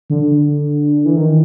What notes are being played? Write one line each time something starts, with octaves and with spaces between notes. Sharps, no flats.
D3
E3
D#3